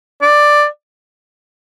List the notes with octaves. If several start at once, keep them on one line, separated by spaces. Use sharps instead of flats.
D5